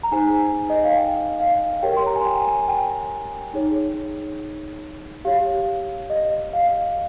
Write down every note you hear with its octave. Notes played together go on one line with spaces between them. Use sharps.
A#5
D#4 G#4 C5 G#5
D#5
F5
G5
F5
G4 A#4 C#5 G5
C6
A#5
G#5
G5
G#5
G5
D#4 G#4 C#5
G4 C#5 F5
D#5
F5